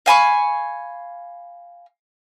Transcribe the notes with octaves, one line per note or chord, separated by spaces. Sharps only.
F5 G#5 B5 C#6